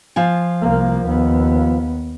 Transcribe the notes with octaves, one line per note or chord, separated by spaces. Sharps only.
F3 F4 G#5
C2 A#3
D#2 B3